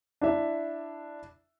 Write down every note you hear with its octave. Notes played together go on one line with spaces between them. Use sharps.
D4 E4 E5